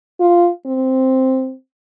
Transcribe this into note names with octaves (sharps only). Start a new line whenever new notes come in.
F4
C4